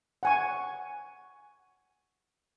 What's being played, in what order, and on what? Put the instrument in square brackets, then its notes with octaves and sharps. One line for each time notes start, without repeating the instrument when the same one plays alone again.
[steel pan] F#5 G#5 C#6